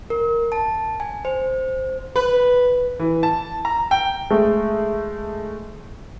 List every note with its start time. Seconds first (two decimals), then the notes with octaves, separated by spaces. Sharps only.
0.10 A#4
0.52 A5
1.00 G#5
1.25 C5
2.16 B4
2.99 E3
3.23 A5
3.65 A#5
3.91 G5
4.30 G#3 A3